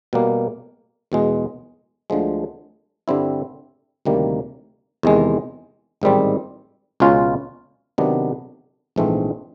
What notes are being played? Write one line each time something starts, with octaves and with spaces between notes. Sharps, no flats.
B2 G3 A#3
E2 B2 G#3
D2 D3 F3 G#3
G2 D3 G3 C4 E4
D2 C3 D#3 G3 A#3
E2 C3 D#3 G#3
A1 G#2 D#3 G3 C4
C#2 B2 G#3 C#4 F4
C3 D#3 F#3 B3 D4
A#1 G#2 E3 A3 C4